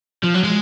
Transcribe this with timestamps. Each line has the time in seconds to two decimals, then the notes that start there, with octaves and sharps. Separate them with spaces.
0.24 F3
0.35 F#3
0.44 G#3